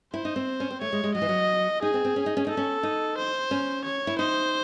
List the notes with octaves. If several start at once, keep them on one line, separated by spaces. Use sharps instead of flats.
E4 C5
D#4
C4
C#4
C4
A3 C#5
G#3
G#3
F#3 D#5
E3
F#3
D#4 G#4
C4
C4
C#4
D#4
C#4
D#4 A4
C#4
D#4
C5
C#4
C#5
E4
D#4 C5